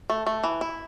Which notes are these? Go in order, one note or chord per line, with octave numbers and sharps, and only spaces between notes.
A3
A3
E3
E4